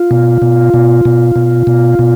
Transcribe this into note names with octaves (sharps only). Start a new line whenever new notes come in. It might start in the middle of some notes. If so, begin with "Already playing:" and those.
Already playing: F4
B2
B2
B2
B2
B2
B2
B2